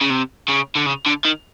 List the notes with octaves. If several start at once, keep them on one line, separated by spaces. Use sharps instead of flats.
C#3
C3
C#3
D3
C#3
D3
D#3